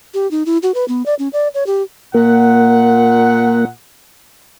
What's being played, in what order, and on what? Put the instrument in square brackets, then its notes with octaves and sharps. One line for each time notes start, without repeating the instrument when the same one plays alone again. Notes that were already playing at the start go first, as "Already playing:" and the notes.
[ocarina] G4
D#4
E4
F#4
B4
B3
D5
C#4
D5
C#5
G4
[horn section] A#2 F#5 [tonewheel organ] A#3